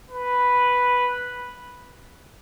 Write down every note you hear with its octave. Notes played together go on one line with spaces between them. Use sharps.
B4